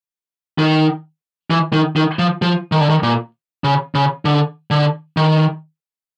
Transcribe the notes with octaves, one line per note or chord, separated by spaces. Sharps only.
D#3
E3
D#3
D#3
F3
F3
D#3
D3
D#3
A#2
C#3
C#3
D3
D3
D#3